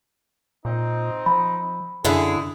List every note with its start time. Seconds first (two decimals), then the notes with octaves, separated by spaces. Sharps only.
0.65 A#2 C4 D#4
1.26 F3 B5
2.04 F#2 D3 E4 G#4